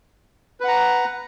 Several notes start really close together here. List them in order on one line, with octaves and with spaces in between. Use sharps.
B4 F#5 A#5